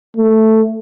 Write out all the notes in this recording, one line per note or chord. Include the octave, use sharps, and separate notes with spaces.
A3